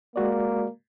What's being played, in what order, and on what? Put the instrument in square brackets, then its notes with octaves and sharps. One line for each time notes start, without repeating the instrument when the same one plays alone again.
[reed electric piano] G#3 F#4 D5 [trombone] A#3